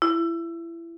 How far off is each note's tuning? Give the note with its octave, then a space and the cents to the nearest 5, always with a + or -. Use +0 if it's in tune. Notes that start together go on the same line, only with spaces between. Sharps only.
E4 +25